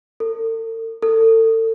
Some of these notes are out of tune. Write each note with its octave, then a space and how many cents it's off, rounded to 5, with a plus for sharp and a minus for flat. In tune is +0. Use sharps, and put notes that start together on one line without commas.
A4 +45
A4 +35